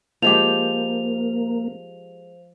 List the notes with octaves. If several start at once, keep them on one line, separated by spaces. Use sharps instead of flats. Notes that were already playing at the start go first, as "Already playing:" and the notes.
F3 G#3 A#3 G4 C5 F5 F7